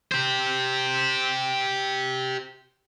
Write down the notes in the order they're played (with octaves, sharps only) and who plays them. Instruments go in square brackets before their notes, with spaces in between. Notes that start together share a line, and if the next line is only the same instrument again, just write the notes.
[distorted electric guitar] G4 C5